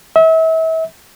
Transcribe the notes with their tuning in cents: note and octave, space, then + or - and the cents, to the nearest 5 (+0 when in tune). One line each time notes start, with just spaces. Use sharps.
E5 -35